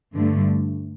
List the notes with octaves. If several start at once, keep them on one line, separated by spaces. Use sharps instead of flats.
G2 D3 A3